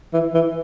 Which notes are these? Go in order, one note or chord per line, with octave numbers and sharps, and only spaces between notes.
E3
E3